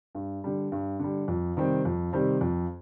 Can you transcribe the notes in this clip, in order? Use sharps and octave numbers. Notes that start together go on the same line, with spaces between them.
G2
D3 G3
G2
D3 G3
F2
C3 D#3 G3 C4
F2
C3 D#3 G3 C4
F2